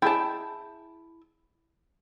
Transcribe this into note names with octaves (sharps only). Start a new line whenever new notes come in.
E4 G#4 G5 A5